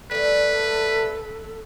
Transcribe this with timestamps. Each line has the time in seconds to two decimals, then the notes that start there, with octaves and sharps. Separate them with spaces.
0.11 G3 A3 A4 B4